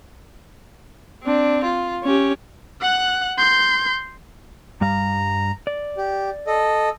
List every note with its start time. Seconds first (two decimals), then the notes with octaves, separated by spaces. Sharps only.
1.23 C4 D4
1.64 F4
2.04 C#4 G4
2.81 F#5 F#6
3.38 C6 G6
4.81 G2 G3 F5 A#5
5.67 D5
5.98 G4
6.47 A4 D#5